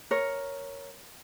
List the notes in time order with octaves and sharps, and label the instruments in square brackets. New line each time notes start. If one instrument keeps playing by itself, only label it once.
[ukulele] A#4 C#5